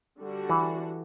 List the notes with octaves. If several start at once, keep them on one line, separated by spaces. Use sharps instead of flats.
D3 G3 D4 F#4
E3